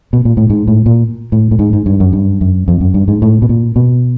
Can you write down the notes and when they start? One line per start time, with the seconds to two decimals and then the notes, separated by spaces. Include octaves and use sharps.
0.13 B2
0.25 A#2
0.37 A2
0.50 G#2
0.68 A2
0.86 A#2
1.32 A2
1.51 A2
1.59 G#2
1.73 G#2
1.86 G2
2.00 F#2
2.13 G2
2.41 F#2
2.68 F2
2.81 F#2
2.94 G2
3.08 G#2
3.22 A2
3.42 B2
3.49 A#2
3.76 B2